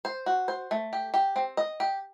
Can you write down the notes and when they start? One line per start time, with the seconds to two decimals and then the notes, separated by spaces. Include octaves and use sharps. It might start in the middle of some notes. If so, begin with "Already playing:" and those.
0.05 C5
0.26 F#4
0.48 C5
0.71 A3
0.93 G4
1.14 G4
1.36 C4
1.57 D#5
1.80 G4